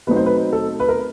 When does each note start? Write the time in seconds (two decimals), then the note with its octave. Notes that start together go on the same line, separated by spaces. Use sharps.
0.07 B2 F#3 A3 C4 D#4 B4
0.16 C5
0.26 B4
0.53 A4
0.80 B4
0.88 A#4